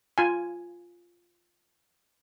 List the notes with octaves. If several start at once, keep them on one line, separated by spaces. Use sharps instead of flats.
F4 G#5